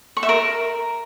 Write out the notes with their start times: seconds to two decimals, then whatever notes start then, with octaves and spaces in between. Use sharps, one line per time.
0.17 C#6
0.23 E5
0.29 A#4